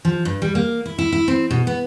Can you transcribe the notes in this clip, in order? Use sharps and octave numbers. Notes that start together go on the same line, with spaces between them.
F3
G2
G3
A#3
E4
E4
E4
C4
B2
B3